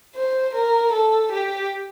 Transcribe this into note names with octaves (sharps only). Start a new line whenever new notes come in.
C5
A#4
A4
G4